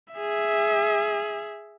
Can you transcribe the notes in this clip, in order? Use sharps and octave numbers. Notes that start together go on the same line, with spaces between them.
G#4 E5